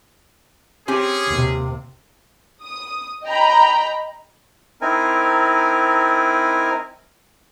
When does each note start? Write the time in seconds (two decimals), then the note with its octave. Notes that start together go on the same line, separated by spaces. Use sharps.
0.88 C4 C#4 G4 G#4 G#5
1.28 D#2 C3
2.63 D#6
3.25 D#5 G5 A#5 B5
4.82 C4 D#4 E4 A#4 G#5